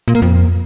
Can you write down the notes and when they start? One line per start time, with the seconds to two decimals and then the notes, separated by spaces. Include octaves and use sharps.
0.08 A#2
0.15 A#3
0.22 F2